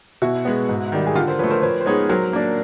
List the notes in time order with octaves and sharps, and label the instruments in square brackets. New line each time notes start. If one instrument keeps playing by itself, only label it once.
[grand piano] B2 [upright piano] E4 F#4
[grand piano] G#3 B3
G#2
D#3 G3
[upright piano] G#4
[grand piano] D3 [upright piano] F4 G4
[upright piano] A#4 C5
[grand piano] F3 [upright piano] B4 C#5
[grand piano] A3
[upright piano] A#4 C5
[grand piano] F3 [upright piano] B4 C#5
[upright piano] C5
[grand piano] G#3 B3 D#4 G#4 [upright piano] B4 C#5
[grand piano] F#3 [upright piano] A#4 C5
[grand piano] A#3 D4